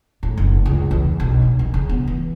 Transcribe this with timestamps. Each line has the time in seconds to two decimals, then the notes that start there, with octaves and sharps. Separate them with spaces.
0.23 A2
0.38 F#1
0.66 C#2
0.91 E2
1.20 B1
1.42 A#2
1.59 D#3
1.74 C#3
1.89 B3
2.08 E3